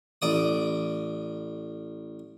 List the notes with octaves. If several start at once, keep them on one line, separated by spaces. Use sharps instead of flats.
A1 D5 D#6